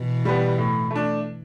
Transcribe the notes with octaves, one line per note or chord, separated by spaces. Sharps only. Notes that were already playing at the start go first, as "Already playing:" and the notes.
Already playing: B2 E3
G3 B3
A2
A3 D4